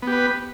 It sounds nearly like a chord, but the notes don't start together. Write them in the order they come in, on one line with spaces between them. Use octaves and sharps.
B3 G4 B4